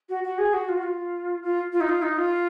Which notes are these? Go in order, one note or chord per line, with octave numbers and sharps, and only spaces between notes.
F#4
F#4
G#4
F#4
F4
F#4
F4
F4
F4
D#4
F4
D#4
F4